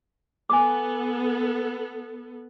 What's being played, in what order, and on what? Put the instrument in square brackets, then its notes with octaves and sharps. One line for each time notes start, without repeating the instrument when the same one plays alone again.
[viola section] B3 A4 [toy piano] G#5 D6